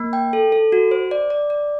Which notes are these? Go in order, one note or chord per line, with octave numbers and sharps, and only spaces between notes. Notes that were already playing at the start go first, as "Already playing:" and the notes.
Already playing: A#3
G5
A4
A4
F#4
C5
D5
D5
D5